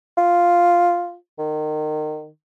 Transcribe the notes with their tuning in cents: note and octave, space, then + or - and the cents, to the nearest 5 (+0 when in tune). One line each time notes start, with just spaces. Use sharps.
F4 +0
D#3 -25